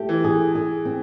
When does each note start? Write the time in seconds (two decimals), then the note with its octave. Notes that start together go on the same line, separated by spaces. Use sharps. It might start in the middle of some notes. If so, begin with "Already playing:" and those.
Already playing: A3 G4
0.09 E3
0.24 G#4
0.55 G#4
0.85 C4